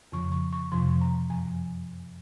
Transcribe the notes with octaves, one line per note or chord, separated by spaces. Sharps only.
F2 C#3 F3 C#6
C#6
C#6
F2 C3 F3 C6
A#5
F#2 F3 G#5